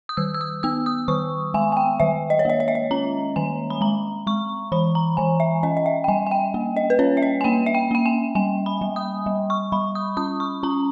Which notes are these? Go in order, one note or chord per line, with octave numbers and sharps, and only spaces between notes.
D#6
D#3 E6
E6
D#6
B3 E6
D#6
D#3 C#6
G#3 G#5
G#5
G5
D#3 E5
D#5
C#5
A#3 D#5
D#5
E5
D#5
C#4 A#5
D#3 G#5
B5
G#3 A#5
G#3 C#6
E3 B5
A#5
E3 G#5
E5
C#4 D#5
D#5
E5
G5
G3 G#5
G#5
G5
A#3
D#5
B4
C#4 C#5
E5
D#5
G#5
A#3 G5
E5
G5
A#3 G5
G#5
G3 G#5
B5
G3
D#6
G3
C#6
G3 B5
D#6
C#4 D#6
C#6
C#4 A#5